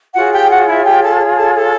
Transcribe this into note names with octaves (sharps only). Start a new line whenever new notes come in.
F4 F#4 G#4 C#5 F#5
G4 G5
F#4 F#5
E4 E5
G4 G5
A4 A5
A4 A5
A4 A5